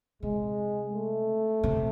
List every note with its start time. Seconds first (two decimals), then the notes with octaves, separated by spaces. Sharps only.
0.23 C3 G#3
0.93 A3
1.63 C3